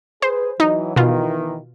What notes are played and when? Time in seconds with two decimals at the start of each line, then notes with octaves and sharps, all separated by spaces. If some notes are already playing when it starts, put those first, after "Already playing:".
0.22 G#4 B4 C5
0.60 E3 F#3 D#4
0.96 B2 D#3 E3 F4